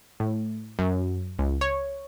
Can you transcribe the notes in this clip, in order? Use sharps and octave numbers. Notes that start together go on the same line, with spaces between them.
A2
F#2
C#2
C#5